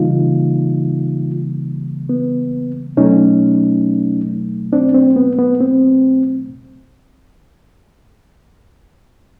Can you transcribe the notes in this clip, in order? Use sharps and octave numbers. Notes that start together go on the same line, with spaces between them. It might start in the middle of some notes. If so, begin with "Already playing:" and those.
Already playing: C#3 E3 G3 A#3 D#4 F4
B3
B2 F#3 A3 C#4 D#4
C4 D4
C4
B3
B3
C4